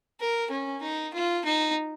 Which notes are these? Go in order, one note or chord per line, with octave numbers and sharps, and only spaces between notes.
A#4
C#4
D#4
F4
D#4